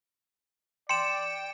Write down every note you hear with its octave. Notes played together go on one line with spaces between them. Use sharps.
D5 G5 C6 C#7 E7